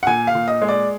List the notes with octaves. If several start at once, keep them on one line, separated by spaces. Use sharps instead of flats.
F#5
A#2 G#5
F5
A#2
D#5
G#3
D5